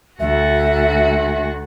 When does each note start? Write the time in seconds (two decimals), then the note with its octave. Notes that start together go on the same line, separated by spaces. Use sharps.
0.20 D2 F#4 E5